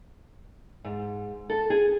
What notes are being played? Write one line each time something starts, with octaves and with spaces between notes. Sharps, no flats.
G#2
A4
G#4